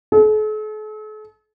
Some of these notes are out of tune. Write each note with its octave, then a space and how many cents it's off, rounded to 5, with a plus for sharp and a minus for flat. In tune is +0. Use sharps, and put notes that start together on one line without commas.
A4 -45